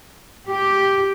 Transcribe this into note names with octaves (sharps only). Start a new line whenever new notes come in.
G4